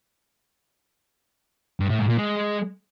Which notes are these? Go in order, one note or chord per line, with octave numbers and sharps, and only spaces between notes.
G2
A2
G#2
A#2
G#3